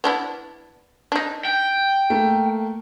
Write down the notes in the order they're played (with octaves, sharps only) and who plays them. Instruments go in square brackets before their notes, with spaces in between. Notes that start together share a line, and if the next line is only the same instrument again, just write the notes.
[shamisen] B3 D4 E4
D4 D#4
[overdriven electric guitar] G5
[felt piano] A3 A#3